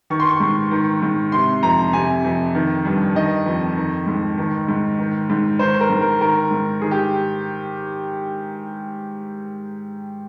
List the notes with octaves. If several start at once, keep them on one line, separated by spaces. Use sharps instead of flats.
D#3 C#6
C6
C#6
G#2
D#3
G#2
C3 C6
F2 A#5
C3 G#5
F2
D#3
G2
D#3 D#5
F2
D#3
G#2
D#3
G#2
D#3
G#2
D#3 C5
A#4
G#2
A#4
D#3 A#4
G#2
D#3 G#4
G4